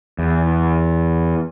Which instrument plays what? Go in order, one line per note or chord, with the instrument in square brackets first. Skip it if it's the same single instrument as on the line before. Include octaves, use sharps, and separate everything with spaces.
[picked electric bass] E2